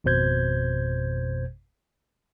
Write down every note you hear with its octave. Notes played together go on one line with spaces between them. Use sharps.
G#1 F2 B2 C5 G6 G#6